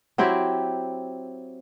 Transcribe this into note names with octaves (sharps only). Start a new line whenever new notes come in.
F#3 C4 E4 G4